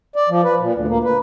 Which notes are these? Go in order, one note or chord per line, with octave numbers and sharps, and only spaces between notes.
D5
F3
B4
A#2
D2
A#3
B4